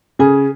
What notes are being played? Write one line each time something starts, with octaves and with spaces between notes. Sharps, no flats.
C#3 G#4